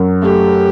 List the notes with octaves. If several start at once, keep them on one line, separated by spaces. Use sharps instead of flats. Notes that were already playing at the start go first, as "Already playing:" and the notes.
Already playing: F#2 F#3
A3 G4